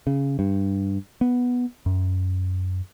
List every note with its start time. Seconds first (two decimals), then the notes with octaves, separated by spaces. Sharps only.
0.07 C#3
0.39 G2
1.21 B3
1.86 F#2